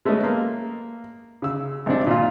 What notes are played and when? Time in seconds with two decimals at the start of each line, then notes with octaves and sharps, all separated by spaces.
0.05 G#3 A3 B3 C#4 D#5
0.24 A#3
1.42 C#3 E6
1.86 G#1 C3 C4 D4
2.07 A#2 F4